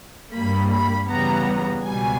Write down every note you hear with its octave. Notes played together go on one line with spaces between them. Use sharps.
G2 G3 A#3 B5
B5
E2 C#3 G3 B3 A#5
C#2 B2 G3 G#5